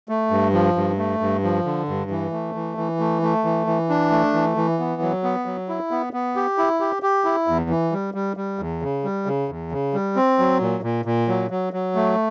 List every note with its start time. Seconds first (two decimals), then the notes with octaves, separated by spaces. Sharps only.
0.09 A3
0.30 G2
0.53 F3
0.76 G2
0.98 A3
1.20 G2
1.43 F3
1.65 D3
1.88 G2
2.10 E3
2.32 A3
2.55 E3
2.77 E3
2.99 A3
3.22 A3
3.44 E3
3.67 E3
3.89 D4
4.11 A3
4.33 E3
4.57 E3
4.79 B3
5.02 F#3
5.23 B3
5.46 F#3
5.69 E4
5.91 B3
6.13 B3
6.36 G4
6.58 E4
6.80 G4
7.03 G4
7.25 E4
7.47 E2
7.69 E3
7.92 G3
8.14 G3
8.37 G3
8.59 E2
8.82 C#3
9.04 G3
9.26 C#3
9.49 E2
9.72 C#3
9.94 G3
10.16 C4
10.39 F#3
10.61 A#2
10.83 A#2
11.05 A#2
11.28 F#3
11.50 F#3
11.73 F#3
11.95 A3